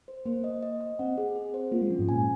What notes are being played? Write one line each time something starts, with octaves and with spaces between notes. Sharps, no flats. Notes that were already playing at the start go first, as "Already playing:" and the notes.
C5
A#3 C5
D#5
D#5
D#5
C4 F#5
G#4
G#4
C5
A#3 F4
G#3
F3 C#4
G#2
A#2 G#5